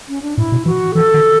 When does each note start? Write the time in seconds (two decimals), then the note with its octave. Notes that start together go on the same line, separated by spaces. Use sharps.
0.09 C#4
0.22 D4
0.37 A2 E4
0.52 B2
0.66 E3 F#4
0.94 E3 A4
1.14 D#3